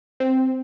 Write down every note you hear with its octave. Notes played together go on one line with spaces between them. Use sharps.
C4